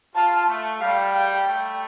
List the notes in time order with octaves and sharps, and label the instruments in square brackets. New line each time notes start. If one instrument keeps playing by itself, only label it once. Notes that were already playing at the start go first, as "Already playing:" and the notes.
[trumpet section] F4 [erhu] A5
[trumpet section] A3
[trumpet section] G3 [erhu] F5
[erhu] G5
[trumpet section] A3